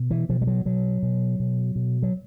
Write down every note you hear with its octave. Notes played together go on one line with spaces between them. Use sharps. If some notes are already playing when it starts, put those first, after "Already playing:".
Already playing: B2
E3
B2 F3
G3
F#3
B2 F#3
B2
B2
B2
F#3